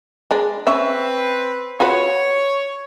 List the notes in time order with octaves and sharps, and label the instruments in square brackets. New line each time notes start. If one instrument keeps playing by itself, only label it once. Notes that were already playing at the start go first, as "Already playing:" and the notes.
[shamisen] G#3 D4
[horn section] C4 B4 [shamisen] C#4 E5
[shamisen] F4 F#4 B4 [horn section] C#5